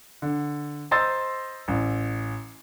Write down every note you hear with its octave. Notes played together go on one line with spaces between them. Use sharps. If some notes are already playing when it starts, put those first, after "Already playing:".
D3
C5 D#5 A#5 C6 E6 A6
A1